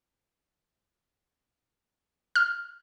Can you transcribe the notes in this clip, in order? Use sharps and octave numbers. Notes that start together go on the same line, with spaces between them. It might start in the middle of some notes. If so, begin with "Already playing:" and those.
F6